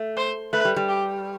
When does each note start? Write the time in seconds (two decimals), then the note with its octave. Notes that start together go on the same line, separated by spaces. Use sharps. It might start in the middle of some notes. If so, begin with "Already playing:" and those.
Already playing: A3
0.17 C5
0.53 A3 B4
0.65 G3
0.76 G3
0.89 G4